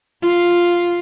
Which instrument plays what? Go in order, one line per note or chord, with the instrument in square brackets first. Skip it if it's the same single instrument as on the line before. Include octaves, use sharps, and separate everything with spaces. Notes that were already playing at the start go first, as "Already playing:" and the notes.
[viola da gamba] F4